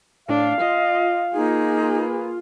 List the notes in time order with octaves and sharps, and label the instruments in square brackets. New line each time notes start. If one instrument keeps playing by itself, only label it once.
[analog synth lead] A2 [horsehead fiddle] D4 [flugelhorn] F5
[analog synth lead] F4 [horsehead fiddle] D#5
[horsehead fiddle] A#3 G#4 [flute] D#4
[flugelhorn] B4